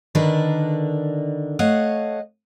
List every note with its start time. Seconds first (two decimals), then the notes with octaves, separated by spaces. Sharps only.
0.15 D3 D#3 D4 A#4 B4
1.59 A3 C#5 D#5 F5 F#5